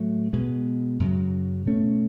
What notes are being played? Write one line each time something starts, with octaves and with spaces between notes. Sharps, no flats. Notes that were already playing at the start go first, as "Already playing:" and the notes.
Already playing: A2 F#3 A3
B2 G#3 B3
F#2 C#3 F#3
B2 A3 C#4